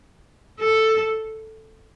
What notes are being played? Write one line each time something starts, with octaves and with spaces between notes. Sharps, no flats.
A4